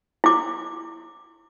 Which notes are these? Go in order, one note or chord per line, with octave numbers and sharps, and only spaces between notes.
E4 D6